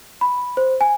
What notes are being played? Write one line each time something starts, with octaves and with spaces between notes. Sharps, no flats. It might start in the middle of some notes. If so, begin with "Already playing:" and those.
B5
C5
G#5